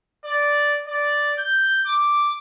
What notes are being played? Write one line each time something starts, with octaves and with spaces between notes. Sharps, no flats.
D5
D5
G6
D6